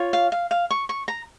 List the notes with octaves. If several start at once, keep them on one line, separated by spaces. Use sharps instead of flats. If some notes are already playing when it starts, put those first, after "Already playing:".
Already playing: F4 C#5
F5
F5
F5
C#6
C#6
A#5